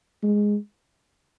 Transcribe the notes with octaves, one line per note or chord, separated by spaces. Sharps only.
G#3